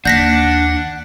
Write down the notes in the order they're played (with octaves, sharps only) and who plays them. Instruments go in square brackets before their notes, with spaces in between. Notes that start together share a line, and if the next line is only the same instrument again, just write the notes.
[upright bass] D#2 [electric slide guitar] D4 [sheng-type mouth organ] F#5 [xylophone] G6 A#6 B6